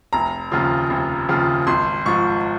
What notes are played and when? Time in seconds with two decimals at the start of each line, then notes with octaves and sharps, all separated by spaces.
0.13 F1 A#5
0.52 D#2 C#3 F3
0.90 F1
1.29 D#2 C#3 F3
1.67 G#1 C6
2.06 G#2 F3 C#6